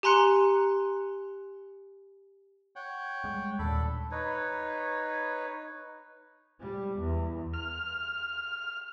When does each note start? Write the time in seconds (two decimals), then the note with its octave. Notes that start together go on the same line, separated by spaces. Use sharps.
0.03 G4 G#5 A#5 C6 F#6 C#7
2.76 C#5 F#5 G5
3.24 G3 G#3
3.59 D#2 A#2 D4 A4 B5
4.11 D#4 B4 C#5
6.60 G3
6.99 E2
7.54 F6